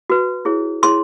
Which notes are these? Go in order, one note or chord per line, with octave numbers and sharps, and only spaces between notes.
F#4 B4
E4 G#4 C#5
E4 G#4 C#5 C6